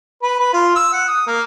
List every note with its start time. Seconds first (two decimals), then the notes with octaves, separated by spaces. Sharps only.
0.22 B4
0.39 B4
0.53 F4
0.76 E6
0.93 F#5
1.08 D#6
1.27 A#3